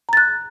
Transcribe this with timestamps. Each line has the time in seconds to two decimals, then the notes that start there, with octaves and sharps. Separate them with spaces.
0.09 A#5
0.13 A6
0.17 F#6